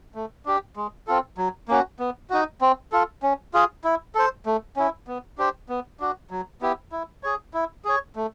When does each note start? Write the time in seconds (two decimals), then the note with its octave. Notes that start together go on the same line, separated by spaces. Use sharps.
0.15 A3
0.46 D4 G4
0.76 G#3
1.07 C4 F4 A4
1.38 F#3
1.68 A#3 C#4 F#4
1.99 B3
2.30 D#4 F#4
2.61 C4
2.92 F4 A4
3.23 C#4
3.54 F4 G#4
3.84 E4
4.15 A4 C5
4.46 A3
4.76 C#4 E4
5.07 B3
5.38 D4 G4 C5
5.69 B3
6.00 D4 F#4
6.31 F#3
6.61 B3 E4 G4
6.92 E4
7.23 G#4 C#5
7.54 E4
7.85 G#4 C#5
8.16 A3